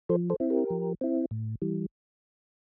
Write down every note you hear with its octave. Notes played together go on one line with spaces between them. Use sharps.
F3 A4 C5
A4 C5
C4 E4
G4 A#4
F3
C4 E4
A2
E3 G3